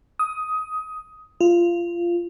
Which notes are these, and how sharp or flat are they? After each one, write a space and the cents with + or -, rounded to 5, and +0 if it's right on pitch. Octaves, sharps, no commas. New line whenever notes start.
D#6 +15
F4 -15